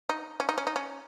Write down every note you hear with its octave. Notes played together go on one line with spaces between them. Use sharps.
D#4
C#4
D#4
C#4
D#4
C#4